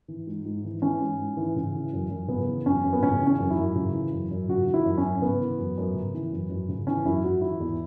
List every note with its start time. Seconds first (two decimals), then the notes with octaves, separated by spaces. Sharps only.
0.08 E3
0.27 G#2
0.45 G#2
0.64 E3
0.82 E3 C#4
1.01 G#2
1.19 G#2
1.37 E3
1.56 C#3
1.74 E3
1.93 F#2
2.10 F#2
2.28 C#3 B3
2.47 E3
2.66 F#2 C#4
2.84 F#2
2.93 B3
3.03 C#3 C#4
3.20 E3
3.27 C#4
3.38 F#2
3.50 E4
3.57 F#2
3.75 C#3
3.94 E3
4.12 F#2
4.31 F#2
4.48 C#3 F#4
4.67 E3
4.74 E4
4.85 F#2
4.98 C#4
5.04 F#2
5.22 C#3 B3
5.40 E3
5.58 F#2
5.78 F#2
5.95 C#3
6.14 E3
6.32 F#2
6.50 F#2
6.68 C#3
6.87 E3 C#4
7.06 F#2 E4
7.24 F#2 F#4
7.42 E3 E4
7.60 E2